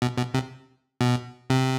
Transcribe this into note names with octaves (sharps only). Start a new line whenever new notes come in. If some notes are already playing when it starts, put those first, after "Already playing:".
B2
B2
C3
B2
C3